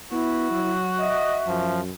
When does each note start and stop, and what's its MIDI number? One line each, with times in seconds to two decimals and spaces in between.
0.12 0.46 59
0.12 0.70 64
0.12 1.81 66
0.51 1.13 54
1.00 1.41 75
1.00 1.76 76
1.47 1.91 42
1.47 1.80 53